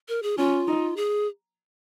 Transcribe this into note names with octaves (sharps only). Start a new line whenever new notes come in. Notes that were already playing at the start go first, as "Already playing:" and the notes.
A#4
G#4
C#4 F4
D#4
G#4